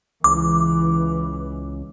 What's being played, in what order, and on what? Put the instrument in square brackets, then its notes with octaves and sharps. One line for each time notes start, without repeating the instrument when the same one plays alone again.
[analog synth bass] C#2 [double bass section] E3 [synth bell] D6